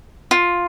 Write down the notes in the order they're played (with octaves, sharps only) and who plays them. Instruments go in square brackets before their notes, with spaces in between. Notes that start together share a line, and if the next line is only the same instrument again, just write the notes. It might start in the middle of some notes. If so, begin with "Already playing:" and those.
[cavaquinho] F4